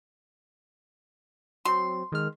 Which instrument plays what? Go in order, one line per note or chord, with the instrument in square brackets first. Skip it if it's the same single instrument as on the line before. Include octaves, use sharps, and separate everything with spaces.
[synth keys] F#3 C4 [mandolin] C6
[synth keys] D#3 G#3 F6